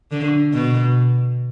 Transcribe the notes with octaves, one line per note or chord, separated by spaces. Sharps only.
D3
B2